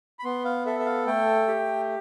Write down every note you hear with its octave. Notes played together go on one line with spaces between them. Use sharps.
B5
B3 C6
F5
A4 E5
E5
F5
A3 G5
G4